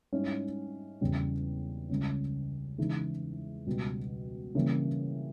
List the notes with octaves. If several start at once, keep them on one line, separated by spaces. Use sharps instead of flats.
G#2 G3 C#4 E4
E2 C#3 G3
C#2 C#3 G3 C#4
C#3 E3 G#3 D#4
C#2 B2 G3
C#3 E3 G3 A#3